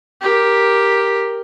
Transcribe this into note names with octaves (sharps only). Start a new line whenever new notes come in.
G4 A#4